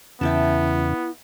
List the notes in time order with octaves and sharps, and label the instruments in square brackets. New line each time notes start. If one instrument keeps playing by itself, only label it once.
[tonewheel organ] E2 C#3 [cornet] B3 [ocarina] E4 [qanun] E5 G5 A5